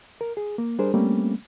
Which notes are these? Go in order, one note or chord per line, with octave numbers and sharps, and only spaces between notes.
A#4
G#4
A#3
G3 D4 G#4 A#4 C5
G3 A3 A#3 C4 C#4